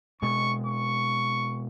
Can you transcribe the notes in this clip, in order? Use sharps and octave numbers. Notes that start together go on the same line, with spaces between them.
B2 G#3 C4 C#6
C#6